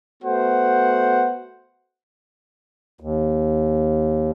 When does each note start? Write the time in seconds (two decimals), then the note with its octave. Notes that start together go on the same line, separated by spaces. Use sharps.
0.23 A3 B3 F#4 C5 F#5
3.00 D#2